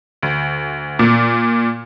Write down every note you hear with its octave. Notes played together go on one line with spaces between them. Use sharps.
D2
A#2